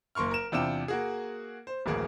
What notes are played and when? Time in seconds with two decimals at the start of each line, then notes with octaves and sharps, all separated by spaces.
0.15 F#1 A#3 C6 C#6 F6
0.31 A#4 E7
0.52 E2 C3 D4 F4 G5 E7
0.88 A#3 F#4 G#4
1.67 C5
1.86 D1 A1 A#3 G#4